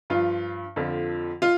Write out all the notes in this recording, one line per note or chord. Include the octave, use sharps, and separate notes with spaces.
G2 F3 F4
F2 D3 F3
F4